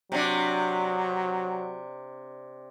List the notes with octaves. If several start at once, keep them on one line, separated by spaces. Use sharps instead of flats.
C3 F#3 D4